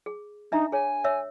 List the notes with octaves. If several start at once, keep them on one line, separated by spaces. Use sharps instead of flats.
G#4
D4 D#4 E5 A#5
G#4 C#5 G#5
C#5 E5 E6